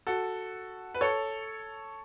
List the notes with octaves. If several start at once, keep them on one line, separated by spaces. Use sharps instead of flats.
F#4 A4
B4
A4 C#5